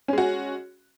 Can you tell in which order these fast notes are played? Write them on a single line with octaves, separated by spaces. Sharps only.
C#4 G#3 F#4